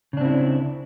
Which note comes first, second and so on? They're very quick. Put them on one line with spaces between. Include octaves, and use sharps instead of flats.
C#3 D4 C4 E4